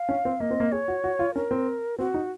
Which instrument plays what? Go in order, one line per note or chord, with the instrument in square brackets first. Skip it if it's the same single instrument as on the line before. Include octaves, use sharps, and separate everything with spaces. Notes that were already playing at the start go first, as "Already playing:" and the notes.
Already playing: [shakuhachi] F5
[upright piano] C#4
C4
[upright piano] A#3 [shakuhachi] D#5
[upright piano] C4
A#3
[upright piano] G#4 [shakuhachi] C#5
[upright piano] F#4
F#4
F4
[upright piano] C#4 [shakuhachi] A#4
[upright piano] C4
[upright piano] C4 [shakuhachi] F#4
[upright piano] D#4